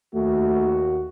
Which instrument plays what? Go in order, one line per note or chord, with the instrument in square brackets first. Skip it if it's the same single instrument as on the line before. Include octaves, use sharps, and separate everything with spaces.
[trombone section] D#2 F#4 [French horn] A3